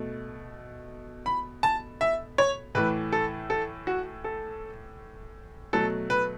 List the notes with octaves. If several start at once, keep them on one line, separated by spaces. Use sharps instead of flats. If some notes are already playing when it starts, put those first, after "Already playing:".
Already playing: B2 A3
B5
A5
E5
C#5
A2 E3 A3 B4
A4
A4
F#4
A4
B2 F#3 A3 A4
B4